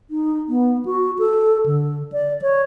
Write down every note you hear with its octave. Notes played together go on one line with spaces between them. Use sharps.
D#4
B3
F#4
A4
D3
D5
C#5